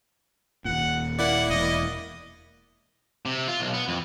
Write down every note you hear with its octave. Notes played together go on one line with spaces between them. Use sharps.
D#1 A#2 F#5
A#3 E4 D5 F#5
E1 D#5
C3
F4
B1
B3
F2